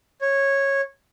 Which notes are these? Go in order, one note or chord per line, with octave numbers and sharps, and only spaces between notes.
C#5